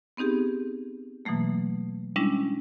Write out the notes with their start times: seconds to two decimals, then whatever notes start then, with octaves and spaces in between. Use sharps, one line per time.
0.17 B3 C4 D#4 G4 G#4
1.25 B2 E3 F#3 A3 A#3
2.16 G3 G#3 C#4 D4 E4